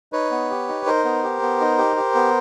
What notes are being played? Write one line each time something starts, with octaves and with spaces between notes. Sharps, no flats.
D#4 B4 C#5
B3
G4
D#4
D#4 A#4 C5
B3
G4
B3
D#4
G4
G4
B3